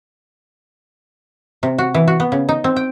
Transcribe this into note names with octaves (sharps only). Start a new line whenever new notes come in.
C3
F#4
E3
F#4
B3
C#3
D#4
C4
G5